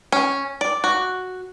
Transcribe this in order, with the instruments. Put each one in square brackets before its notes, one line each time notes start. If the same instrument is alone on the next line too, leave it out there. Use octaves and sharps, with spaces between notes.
[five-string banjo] C#4
D5
F#4